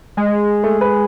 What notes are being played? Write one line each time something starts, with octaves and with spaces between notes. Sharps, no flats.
G#3
A3
B4